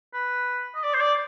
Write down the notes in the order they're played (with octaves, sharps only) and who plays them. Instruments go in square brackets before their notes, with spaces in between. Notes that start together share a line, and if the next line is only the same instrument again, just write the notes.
[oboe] B4
D#5
D5
C5
D5